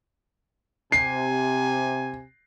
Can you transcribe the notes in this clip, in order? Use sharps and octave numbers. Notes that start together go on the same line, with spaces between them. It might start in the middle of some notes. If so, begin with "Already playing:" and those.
C3 G#5 C7